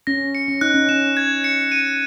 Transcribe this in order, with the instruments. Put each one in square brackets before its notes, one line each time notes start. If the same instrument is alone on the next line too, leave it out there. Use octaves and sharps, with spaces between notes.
[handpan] C#4 [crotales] A#6
[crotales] C#7
[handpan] C#4
[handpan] D#4 [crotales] F#6
[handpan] C#4
[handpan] C#4 [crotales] E7
[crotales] G#6
C#7
D#7